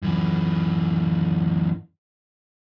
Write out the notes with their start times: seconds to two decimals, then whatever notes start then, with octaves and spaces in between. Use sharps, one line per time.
0.02 F#2 E3